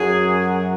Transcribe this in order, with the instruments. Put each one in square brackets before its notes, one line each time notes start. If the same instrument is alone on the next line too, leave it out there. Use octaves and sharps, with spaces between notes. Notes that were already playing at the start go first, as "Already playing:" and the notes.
Already playing: [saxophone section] F#2 F#3 G#4